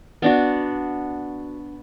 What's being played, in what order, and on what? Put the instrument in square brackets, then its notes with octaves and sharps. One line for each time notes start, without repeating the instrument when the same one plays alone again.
[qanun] B3 D4 F#4